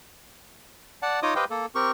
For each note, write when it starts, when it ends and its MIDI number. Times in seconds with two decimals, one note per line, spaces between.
1.02 1.20 74
1.02 1.20 78
1.02 1.20 81
1.23 1.34 63
1.23 1.34 65
1.23 1.34 73
1.23 1.34 75
1.23 1.34 86
1.23 1.34 87
1.36 1.45 67
1.36 1.45 71
1.36 1.45 72
1.36 1.45 75
1.36 1.45 77
1.36 1.45 79
1.50 1.66 58
1.50 1.66 69
1.75 1.92 60
1.75 1.92 67
1.75 1.92 70
1.75 1.92 85